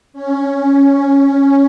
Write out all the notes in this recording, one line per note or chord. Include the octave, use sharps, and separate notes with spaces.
C#4